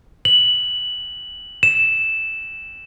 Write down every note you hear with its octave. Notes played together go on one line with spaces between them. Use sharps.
F#7
E7